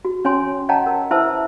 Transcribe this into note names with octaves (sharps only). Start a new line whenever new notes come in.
F#4
C#4 C#5 G#5 C6
C#5 D#5 F#5 G5 A5 A#5
A#4
E4 B4 C5 E5 A5 E6